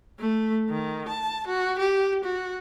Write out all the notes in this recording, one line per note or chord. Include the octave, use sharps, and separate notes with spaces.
A3
D#3
A5
F#4
G4
F#4